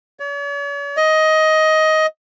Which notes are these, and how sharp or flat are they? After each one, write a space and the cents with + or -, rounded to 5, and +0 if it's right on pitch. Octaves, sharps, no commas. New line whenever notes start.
C#5 +45
D#5 +15